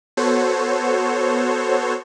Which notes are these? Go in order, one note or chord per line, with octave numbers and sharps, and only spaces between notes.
B3 F#4 A4 C5 C#5